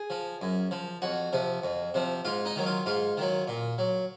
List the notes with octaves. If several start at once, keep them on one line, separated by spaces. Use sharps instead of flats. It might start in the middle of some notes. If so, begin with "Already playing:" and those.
Already playing: G#4
F3
F#2
F3
F2 F#4
C3 F3
F2
C3 F3
G#2 F4
D#4
D#3 F#3
F4
G#2 F4
D#3 F#3
A#2
F#3